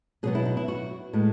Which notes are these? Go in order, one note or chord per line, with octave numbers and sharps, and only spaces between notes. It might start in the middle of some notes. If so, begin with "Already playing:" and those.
B2 F#3 B3 G#4
E4
D#4
E4
F#4
A2 G#3 B3